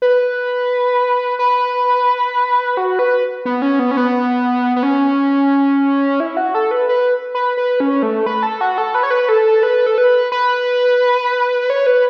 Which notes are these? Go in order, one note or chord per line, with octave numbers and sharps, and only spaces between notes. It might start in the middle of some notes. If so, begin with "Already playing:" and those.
B4
B4
F#4
B4
B3
C#4
B3
C#4
B3
B3
C#4
E4
F#4
A4
B4
B4
B4
B4
C#4
A3
B4
A4
F#4
A4
B4
C#5
B4
A4
B4
A4
B4
B4
C#5
B4